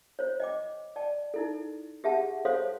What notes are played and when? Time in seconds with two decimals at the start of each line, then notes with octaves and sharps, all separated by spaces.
0.19 C5 C#5
0.40 D#5 G5 D6
0.96 D5 G5 A5
1.34 D#4 E4 A4
2.04 G4 G#4 E5 F#5 A5
2.45 A4 C5 C#5 F5 C6 D#6